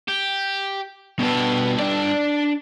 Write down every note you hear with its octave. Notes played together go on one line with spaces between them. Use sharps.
G4
G2 B2 B3 A4
D4 D5